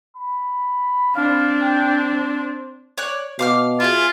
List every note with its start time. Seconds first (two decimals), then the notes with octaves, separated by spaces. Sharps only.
0.17 B5
1.15 C4 D4 F5
1.62 G5
2.10 C5
2.98 C#5 D5 F#6
3.39 B2 F5 D6 F6
3.80 E4 F4 G#4